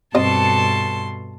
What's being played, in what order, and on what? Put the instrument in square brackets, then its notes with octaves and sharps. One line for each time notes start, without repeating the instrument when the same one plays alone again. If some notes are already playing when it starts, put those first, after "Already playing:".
[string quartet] G2 B2 C6 [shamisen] C4 D#5 [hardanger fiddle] A4 A5